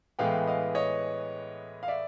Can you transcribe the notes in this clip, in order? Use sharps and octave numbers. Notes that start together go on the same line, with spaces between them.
A2 E3 G#3 B3 F5 G5
D#5 F5
C#5 D#5
F5
D5 E5